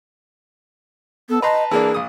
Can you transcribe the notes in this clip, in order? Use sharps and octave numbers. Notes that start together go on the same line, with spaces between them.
B3 A4
B4 D#5 A5 A#5 C6
E3 A#3 D4 G#4
A#1 D#6